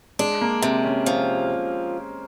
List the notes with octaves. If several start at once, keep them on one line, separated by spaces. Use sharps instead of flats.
G#3 D4
A#3
C3 C4
C#4
F3 C#4